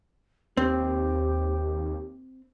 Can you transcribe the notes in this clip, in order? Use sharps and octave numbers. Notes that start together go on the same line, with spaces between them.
D#2 C4 G4